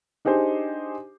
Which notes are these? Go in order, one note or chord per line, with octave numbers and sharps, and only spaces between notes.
D4 D#4 G4 G#4 C5